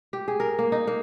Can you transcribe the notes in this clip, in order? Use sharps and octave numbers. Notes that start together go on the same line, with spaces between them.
G4
G#4
A#4
A#3
D#4
A#3